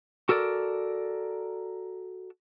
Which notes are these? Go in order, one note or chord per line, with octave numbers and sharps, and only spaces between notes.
F#4 A4 A#4 D5